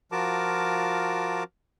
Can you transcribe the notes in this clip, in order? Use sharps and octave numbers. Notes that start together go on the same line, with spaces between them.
F3 F4 F#4 A#4 A5 D6